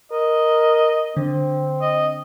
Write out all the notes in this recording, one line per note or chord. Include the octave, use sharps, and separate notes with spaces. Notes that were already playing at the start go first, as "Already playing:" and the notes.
A#4 D#5
D3 C4
D#5